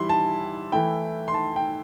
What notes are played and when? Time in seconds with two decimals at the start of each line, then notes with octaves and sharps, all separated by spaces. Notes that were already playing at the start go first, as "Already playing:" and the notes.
Already playing: E3 G3 E4 C6
0.09 A5
0.72 E3 A3 E4 G5
1.28 C6
1.34 A5
1.56 G5